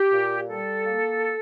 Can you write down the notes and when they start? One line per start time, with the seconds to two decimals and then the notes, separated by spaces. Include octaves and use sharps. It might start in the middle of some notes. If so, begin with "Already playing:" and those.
Already playing: G4
0.12 A#2
0.49 G3 A4
0.86 A#3